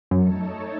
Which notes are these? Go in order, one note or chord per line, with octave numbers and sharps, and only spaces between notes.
F#2 A3 D#4 A4 C#5